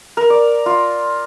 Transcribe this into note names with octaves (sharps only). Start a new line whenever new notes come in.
A#4
D5
F4